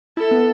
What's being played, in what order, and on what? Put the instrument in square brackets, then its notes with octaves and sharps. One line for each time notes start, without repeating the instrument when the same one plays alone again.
[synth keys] E4 [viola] A4
[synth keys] B3